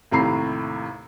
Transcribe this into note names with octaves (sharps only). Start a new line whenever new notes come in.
D#2 A2 C3 A#5 B5 C7